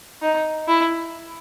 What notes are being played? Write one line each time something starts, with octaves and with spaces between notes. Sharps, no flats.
D#4
E4